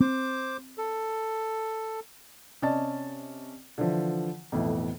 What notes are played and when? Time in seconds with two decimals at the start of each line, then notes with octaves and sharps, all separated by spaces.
0.01 C4 C5 D6
0.78 A4
2.62 C3 C#4 D5 D#5 A5 A6
3.78 D3 E3 F3
4.52 B1 F2 A2 E3